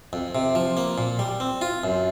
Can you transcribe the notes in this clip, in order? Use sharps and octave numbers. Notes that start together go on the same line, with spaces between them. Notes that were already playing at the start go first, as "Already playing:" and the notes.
F2
C3
F3
A#3
A#2
G3
C4
F4
F#2